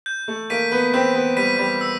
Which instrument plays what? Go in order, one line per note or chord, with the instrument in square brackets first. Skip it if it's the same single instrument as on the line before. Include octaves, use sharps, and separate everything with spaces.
[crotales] G6
[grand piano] A3
[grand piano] A#3 [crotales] B6 D#7
[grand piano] B3
[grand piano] C4 [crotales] G6
[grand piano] B3
[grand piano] G3 [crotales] B6 D#7
[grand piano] G3
[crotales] E6